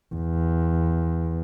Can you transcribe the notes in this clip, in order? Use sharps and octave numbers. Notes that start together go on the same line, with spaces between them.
E2